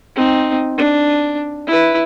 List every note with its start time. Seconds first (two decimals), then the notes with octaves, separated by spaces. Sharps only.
0.16 C4 D#4
0.78 D4
1.67 E4 B4